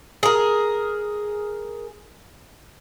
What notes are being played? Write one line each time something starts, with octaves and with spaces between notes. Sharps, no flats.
G#4 A#4